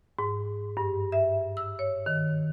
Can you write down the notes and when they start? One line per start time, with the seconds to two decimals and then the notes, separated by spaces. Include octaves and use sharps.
0.19 G#2
0.77 G2
1.12 E5
1.57 E6
1.79 C#5
2.06 D#3